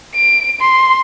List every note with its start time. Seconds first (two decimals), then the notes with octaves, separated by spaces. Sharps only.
0.15 D7
0.60 C6